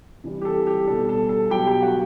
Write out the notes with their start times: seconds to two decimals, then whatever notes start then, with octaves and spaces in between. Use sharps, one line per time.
0.24 C3 E3 G3
0.41 G4
0.45 A4
0.67 G4
0.87 B2 G3 A4
1.09 A4
1.29 A4
1.50 B2 F#3 G4 G5
1.67 G4 G5
1.82 F#4 F#5